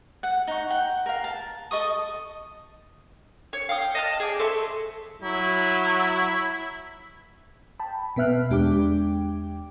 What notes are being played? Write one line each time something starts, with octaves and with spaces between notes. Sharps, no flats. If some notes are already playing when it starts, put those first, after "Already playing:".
F#5
D#4 C#6
F#5 G5
A#4 F5
A5
A4 D#5 C#6 D#6
C#5
F5 G5 D#6
D#5 A5 F6
G#4 D5 G5
A3 A4 C5 E5
F#3 E4
G5 A5 B5
B2 B3 B4 E5 F6 F#6
E2 G#3 D4 G4 G5 D6